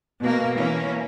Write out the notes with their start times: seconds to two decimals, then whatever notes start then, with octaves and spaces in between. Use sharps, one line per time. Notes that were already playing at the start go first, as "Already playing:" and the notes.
0.20 B2 A#3
0.57 E3 A#3 C#4